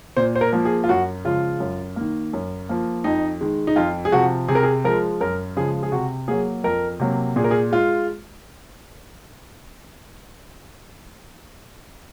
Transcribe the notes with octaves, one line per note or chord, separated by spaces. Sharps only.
A#2 C5
C5
A#4
F3 A#3
G#4
F4
F#2 F#4
C#3 F3 G#3 F4
F#2
D#3 A#3
F#2
F3 A#3
F2 D#4
D#3 G#3
D#4
F2 F4
G#4
C3 F3 F#4
C3 G#4
A#4
G#4
F3 G#3 A#4
F#2 A#4
C#3 F3 G#3 G#4
G#4
C3 F#4
F#3 A#3 G#4
F2 A#4
C3 F#3 A#3
A#2 G#4
A#4
G#4
G#3 F4